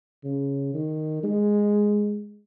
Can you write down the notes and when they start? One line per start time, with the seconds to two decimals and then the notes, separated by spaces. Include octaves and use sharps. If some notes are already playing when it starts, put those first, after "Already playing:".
0.24 C#3
0.74 D#3
1.23 G#3